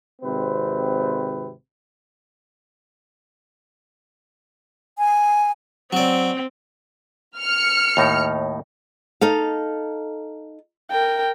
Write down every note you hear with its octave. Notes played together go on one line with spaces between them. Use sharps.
G#1 C3 C4 B4
G#5
F#3 C4 D5
F6 C#7
D#2 A2 D#4
D#4 A4 F5
A#4 G5